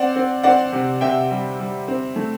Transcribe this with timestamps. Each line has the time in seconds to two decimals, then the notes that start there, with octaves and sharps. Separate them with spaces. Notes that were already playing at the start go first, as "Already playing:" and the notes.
Already playing: C4 D5 F#5
0.16 C4
0.43 C4 D5 F#5
0.72 C3
1.01 C3 E5 G5
1.31 G3
1.59 G3
1.88 C4
2.16 A3